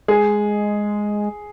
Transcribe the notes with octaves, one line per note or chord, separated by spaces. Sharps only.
G#3 G#4